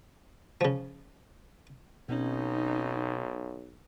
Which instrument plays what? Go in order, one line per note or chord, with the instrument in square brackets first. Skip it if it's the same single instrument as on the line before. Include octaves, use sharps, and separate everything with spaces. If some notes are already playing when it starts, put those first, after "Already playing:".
[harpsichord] C#3 F3
[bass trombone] B1 [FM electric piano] B2 C4 C#4 [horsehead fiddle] D#4